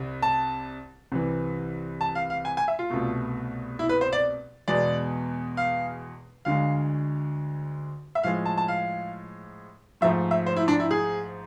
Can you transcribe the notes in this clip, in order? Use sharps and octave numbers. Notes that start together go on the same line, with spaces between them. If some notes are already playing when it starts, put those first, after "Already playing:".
Already playing: C2 C3
A5
C2 C3 E3
A5
F5
F5
G#5
G#5
E5
F4
C2 B2 A3
E4
B4
C5
D5
E2 B2 G#3 D5
F5
D2 D3 G#3 F5
E5
A2 F3 G#3 F5
A5
A5
F5
G#2 F3 A3 E5
E5
C5
E4
D4
E4
G#4